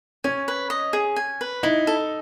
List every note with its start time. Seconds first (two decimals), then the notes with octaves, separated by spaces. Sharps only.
0.24 C#4 G#5
0.48 B4
0.70 D#5
0.93 G#4
1.16 G#5
1.41 B4
1.63 D#4 E4
1.87 A4